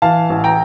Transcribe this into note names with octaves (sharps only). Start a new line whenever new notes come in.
E3 F5 A5
A1
G5 A#5